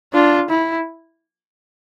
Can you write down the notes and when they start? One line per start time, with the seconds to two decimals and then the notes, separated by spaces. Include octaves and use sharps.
0.13 D4 F4
0.49 E4